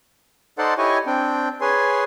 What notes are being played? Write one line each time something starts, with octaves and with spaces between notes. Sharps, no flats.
D#4 A4 C5 D5 F#5 C6
E4 G4 C#5 D#5 G#5 C#6
C4 D4 G5
G#4 B4 C#5 G#5 C6